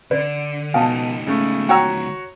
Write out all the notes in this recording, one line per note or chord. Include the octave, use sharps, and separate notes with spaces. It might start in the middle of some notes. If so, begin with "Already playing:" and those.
D3 B4 D5
C#2 B2 D#4 F5 G#5 A5
C#3 A3
F#4 C#5 F#5 G5 A#5 E6